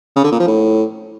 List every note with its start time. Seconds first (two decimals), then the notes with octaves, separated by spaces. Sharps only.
0.16 C#3
0.24 D3
0.32 A#2
0.39 F3
0.47 A2